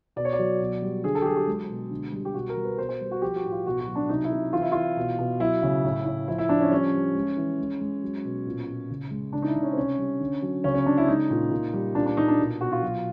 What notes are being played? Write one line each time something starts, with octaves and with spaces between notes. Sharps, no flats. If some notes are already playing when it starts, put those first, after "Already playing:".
B2 D5
C#5
D5
F#3
B2
G3
D3 G#4
A4
G4
F#3 G#4
G4
G#3
B2
D3
G3
G4
B2 F#4
A#4
G3
B4
B2 C5
C5
G3
F#4
F3 G4
F#4
A2
F4
B2 F#4
F#4
F#3
D4
C3 D#4
E4
C3
E3 F4
E4
E3 F4
B2
B2
F#3 E4
C#3
A2
A2
F3 E4
E4
F3 D4
C#4
G3 C#4
G3
G#3
E3
G#3
G#3
F#3
B2
A#2
A#2
C#3
G#3
C#3 D4
D#4
E4
C#3
C#4
C4
C3 C#4
G3
D3
F#3
C#3 C#4
C#4
C#3 D4
E4
G#3 D#4
A#2
A#2
G3
A#2 D4
D4
A#2 D#4
D4
B2
B2 F#4
F4
F#3